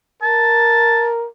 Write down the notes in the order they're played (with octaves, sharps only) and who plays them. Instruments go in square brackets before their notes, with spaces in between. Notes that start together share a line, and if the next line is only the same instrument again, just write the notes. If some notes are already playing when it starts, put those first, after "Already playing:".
[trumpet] A#4 [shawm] A5